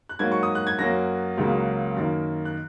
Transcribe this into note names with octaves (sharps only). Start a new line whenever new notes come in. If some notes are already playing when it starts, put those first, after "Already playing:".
F#6
G#2 F#3 A#3 G#6
C#6
D#6
F#6
G#6
F#2 F#3 A#3 A#6
C#2 C#3 F#3 A#3
F#2 D#3 A#3
F#6